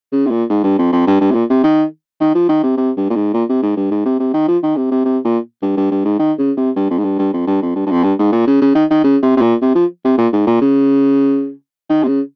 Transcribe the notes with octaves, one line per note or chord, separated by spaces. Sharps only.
C#3
C3
A#2
G#2
G2
F2
F2
G2
G2
C3
A#2
C3
D#3
D#3
F3
D#3
C3
C3
G2
A#2
G#2
A#2
C3
G#2
G2
G#2
C3
C3
D#3
F3
D#3
C3
C3
C3
A#2
G2
G2
G2
G#2
D#3
C#3
C3
G2
F2
G#2
G2
G2
F2
G2
F2
G2
G2
F2
G2
G#2
A#2
C#3
C#3
D#3
D#3
C#3
C3
C3
A#2
C3
F3
C3
A#2
G#2
A#2
C#3
D#3
C3
C#3